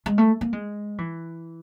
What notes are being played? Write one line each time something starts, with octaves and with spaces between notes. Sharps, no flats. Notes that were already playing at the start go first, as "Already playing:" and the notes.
G#3
A3
A#3
G#3
E3